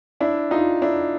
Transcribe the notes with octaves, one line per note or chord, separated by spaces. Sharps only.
D4 E4
D#4 F4
D4 E4